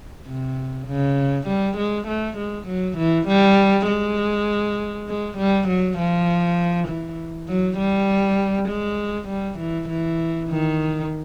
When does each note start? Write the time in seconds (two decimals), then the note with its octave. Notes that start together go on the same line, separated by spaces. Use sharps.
0.27 C3
0.87 C#3
1.47 G3
1.77 G#3
2.07 A3
2.37 G#3
2.67 F#3
2.97 E3
3.28 G3
3.87 G#3
5.08 G#3
5.38 G3
5.68 F#3
5.98 F3
6.88 E3
7.48 F#3
7.78 G3
8.68 G#3
9.28 G3
9.58 E3
9.88 E3
10.48 D#3